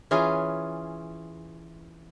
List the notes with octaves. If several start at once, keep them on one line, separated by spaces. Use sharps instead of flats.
E3 C#4 F4 G#4